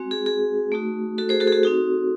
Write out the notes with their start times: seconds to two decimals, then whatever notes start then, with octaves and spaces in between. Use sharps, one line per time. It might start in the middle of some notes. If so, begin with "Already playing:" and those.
Already playing: G#3 C4 F#4
0.11 G#4
0.26 G#4
0.72 A3 D#4 F#4
1.18 F#4 A4
1.29 G#4 C5
1.40 F#4 A4
1.47 G#4
1.52 F#4 A4
1.63 C4 D#4 F#4